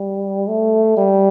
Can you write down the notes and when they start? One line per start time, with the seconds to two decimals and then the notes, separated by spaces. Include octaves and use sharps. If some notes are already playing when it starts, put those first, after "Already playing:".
Already playing: G3
0.48 A3
0.97 G3